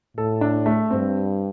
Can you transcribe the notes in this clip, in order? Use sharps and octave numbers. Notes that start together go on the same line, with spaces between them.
A2 A4
D4
A3
G2 C4